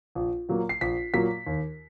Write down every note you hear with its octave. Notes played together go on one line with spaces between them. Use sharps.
A#1
A#2 F#3 A#3
C7
A#1 B6
A#2 F#3 A#3 B6
D#2